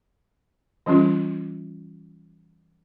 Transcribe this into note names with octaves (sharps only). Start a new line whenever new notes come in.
E3 G3 C#4 F4